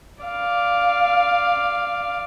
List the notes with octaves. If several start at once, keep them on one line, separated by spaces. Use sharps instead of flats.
D5 F5